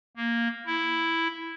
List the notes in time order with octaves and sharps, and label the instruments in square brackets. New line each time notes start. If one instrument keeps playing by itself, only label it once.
[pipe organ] A#3
E4